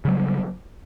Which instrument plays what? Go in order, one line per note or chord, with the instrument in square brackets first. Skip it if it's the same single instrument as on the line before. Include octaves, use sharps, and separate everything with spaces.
[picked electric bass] C#3
F#3
G3